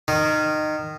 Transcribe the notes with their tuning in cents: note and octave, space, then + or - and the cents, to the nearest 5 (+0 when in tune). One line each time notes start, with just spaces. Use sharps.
D#3 -20